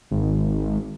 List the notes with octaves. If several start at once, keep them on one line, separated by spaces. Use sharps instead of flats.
G#1